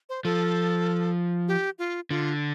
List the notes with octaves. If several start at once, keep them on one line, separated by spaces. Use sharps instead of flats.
C5
F3 A4
G4
F4
D3 F4